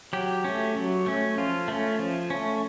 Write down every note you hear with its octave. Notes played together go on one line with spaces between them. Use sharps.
F#3 G4
A3 C#4
F#3
A3 C#4
F3 F4
A3 C#4
F3
A3 C#4